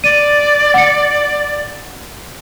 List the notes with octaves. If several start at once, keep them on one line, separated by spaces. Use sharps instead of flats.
D5 D#7
F#5 C#7